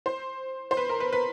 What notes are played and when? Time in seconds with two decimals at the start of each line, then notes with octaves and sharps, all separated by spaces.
0.06 C5
0.71 C5
0.77 B4
0.89 A#4
1.00 B4
1.12 B4